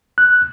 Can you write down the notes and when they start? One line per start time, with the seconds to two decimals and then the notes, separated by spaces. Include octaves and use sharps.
0.18 F#6